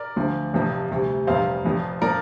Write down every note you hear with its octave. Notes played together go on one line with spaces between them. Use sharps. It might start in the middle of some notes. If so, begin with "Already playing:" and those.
Already playing: A#4 D5
D2 D3 F3
F1 F2 C3 F3
D2 C3 G3
F1 F2 C3 G3 C5 F5
F1 F2 F3
F3 A#4 D5